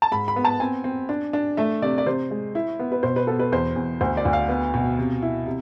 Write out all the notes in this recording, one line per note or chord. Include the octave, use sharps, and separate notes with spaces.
A5
G#2 B5
B5
B3
A5
C4 G#5
C4
D4
D4
A3 E5
C3 D5
D5
C3 C5
G#3
E4
B3
B4
B2 C5
B4
B3 A4
B4
E2 C5
E2
D2 C5
D5
D2
F5
B3
B2
C3
E4
C3